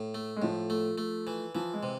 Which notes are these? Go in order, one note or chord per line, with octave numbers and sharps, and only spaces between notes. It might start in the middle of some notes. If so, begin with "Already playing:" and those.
Already playing: A2
A3
G#3
A2 F3
A3
A3
E3
E3 F3
G#3
C3